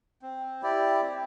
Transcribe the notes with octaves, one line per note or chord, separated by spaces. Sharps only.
C4
E4 G4 D5
C4